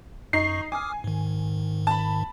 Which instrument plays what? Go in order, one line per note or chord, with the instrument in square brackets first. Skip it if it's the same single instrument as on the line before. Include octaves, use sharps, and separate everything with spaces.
[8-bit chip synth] F#2 C#6 [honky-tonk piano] D#4 C7
[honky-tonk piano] G#5 [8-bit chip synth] D6 D#6 F6
[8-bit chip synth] G#2 D#3
[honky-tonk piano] A5 B5